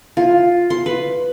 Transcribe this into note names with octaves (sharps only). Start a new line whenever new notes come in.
F4
C6
B4